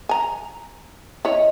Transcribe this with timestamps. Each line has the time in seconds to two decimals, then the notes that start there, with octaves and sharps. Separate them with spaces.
0.09 G#5 A#5
1.25 E4 C#5 D#5